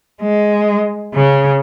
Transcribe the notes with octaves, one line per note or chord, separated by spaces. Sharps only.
G#3
C#3